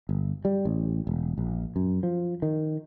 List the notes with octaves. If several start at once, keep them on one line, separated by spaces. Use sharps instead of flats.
G1
G3
A1
E1
A#1
F#2
F3
D#3